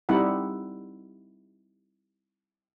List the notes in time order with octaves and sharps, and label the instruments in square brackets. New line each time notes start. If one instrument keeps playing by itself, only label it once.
[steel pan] G3 C4 D#4 E4 F#5